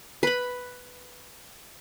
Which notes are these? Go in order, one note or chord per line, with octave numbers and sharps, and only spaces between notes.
B4 B5